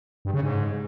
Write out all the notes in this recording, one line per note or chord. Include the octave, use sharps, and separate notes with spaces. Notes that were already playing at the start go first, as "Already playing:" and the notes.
G2
C#3
G#2